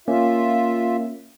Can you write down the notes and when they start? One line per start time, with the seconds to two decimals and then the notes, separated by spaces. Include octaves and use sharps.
0.08 A#3 C#4 F4 E5